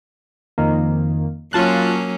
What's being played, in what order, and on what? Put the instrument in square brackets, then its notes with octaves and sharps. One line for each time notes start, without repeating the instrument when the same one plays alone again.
[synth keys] F2 D#3 A#3
[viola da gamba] F#3 A#3 C#4 [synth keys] F4 A5 F#6